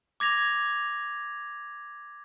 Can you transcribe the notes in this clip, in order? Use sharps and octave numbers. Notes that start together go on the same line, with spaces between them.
D6 G#6 A#6 F7